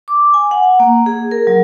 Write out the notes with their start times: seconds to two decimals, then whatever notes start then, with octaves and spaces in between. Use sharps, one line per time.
0.08 D6
0.34 G#5
0.51 F#5
0.80 A#3
1.06 G#4
1.31 A#4
1.47 F#3